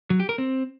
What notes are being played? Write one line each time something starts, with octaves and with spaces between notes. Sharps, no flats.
F#3
G4
A#4
C4